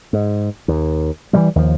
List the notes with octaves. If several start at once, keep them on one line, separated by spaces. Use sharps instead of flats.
G#2
D#2
E3 F#3 G3
D#2 F3